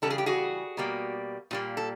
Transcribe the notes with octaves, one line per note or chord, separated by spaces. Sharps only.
C#3 E3 G3 A4
G#4
G4
F#4 G#4
B2 G3 A#3
A#2 G3 A#3
A4